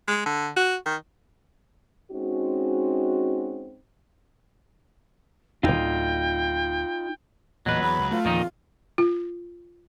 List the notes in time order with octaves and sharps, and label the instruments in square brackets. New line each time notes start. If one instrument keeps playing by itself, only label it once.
[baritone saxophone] G#3
D3
F#4
D#3
[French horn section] G#3 C4 C#4 D#4 F#4
[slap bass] D1 G1 [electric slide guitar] D#4 F4 [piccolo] G5
[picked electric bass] A1 E2 A#2 [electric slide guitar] F#3 B4 [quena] D#5
[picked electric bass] E2 [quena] B5
[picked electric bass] C#2
[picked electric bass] A3 [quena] F4
[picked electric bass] E2 F3 [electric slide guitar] A#2 D#3 D#4
[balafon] F4